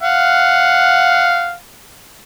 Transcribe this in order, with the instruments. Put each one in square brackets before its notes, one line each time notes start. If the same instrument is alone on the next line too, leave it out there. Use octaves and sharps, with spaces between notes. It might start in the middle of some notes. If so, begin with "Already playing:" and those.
[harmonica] F5 F#5